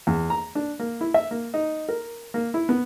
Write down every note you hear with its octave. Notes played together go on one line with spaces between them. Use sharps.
E2
A#5
D4
A#3
E4
E5
A#3
D#4
A#4
A#3
E4
B3